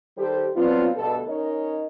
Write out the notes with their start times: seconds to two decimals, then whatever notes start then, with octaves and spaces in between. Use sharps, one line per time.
0.17 D#3 G3 G4 A4 C5
0.56 F#3 B3 C4 D4 F4
0.96 D2 G2 B2 A4
1.27 C#4 D#4 A#4 C#5 D#5